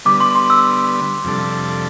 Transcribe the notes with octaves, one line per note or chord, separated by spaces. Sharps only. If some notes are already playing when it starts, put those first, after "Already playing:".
D3 G3 B3 D6
C6
C6
E6
F2 C3 G3 D4 A4